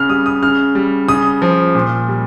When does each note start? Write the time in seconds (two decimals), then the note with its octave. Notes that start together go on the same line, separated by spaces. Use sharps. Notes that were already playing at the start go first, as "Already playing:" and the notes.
Already playing: C#3 F6
0.09 G3 D#6
0.26 D#6
0.42 C#3 F6
0.75 G3
1.08 C#3 D#6
1.42 F3
1.75 A#2
2.08 G3